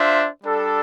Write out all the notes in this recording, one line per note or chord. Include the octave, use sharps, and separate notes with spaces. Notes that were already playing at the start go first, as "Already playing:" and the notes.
Already playing: D4 F4 C5 E5
G3 D4 A4